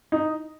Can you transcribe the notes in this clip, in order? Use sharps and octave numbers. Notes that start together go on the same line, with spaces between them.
D#4